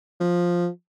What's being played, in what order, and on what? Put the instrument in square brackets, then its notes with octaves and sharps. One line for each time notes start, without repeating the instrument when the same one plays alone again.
[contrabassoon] F3